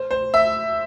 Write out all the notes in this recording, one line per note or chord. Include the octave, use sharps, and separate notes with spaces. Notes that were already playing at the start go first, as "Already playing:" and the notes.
Already playing: C5
C5
E5